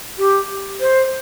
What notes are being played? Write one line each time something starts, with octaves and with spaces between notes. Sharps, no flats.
G4
C5